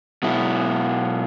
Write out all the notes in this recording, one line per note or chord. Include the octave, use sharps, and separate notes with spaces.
B2 F#3 E4